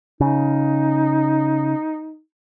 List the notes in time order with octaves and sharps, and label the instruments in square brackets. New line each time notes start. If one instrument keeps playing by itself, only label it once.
[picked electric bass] C#3 [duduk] D#4